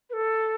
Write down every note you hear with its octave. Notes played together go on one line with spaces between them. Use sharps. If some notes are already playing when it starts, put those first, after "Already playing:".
B4
A4